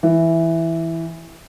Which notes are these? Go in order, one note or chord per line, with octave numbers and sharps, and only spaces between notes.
E3